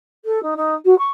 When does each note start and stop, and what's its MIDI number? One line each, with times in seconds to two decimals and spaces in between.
0.25 0.41 69
0.42 0.54 63
0.56 0.74 63
0.85 0.97 66
0.98 1.11 85